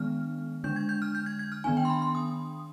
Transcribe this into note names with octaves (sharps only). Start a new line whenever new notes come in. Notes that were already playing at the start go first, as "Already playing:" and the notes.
Already playing: D#3 G#3 B3 D4 F6
D3 G#3 D4 G6
G#6
G6
F6
G6
G#6
G#6
F6
D#3 B3 D4 G#5
G5
C6
B5
C6
D#6